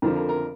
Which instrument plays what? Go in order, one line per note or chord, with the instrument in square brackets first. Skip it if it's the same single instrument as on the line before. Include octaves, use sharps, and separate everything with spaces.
[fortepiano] F2 D3 F3 A#4
A#4
A#4